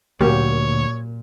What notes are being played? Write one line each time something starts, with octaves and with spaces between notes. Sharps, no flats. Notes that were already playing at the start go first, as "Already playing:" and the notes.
D2 A#2 F#3 A#3 G4 C#5